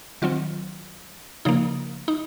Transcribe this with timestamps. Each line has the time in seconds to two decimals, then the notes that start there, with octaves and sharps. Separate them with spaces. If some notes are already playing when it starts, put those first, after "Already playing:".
0.22 D#3 F#3 C4 F4
1.45 C#3 F3 A#3 D#4
2.08 D#4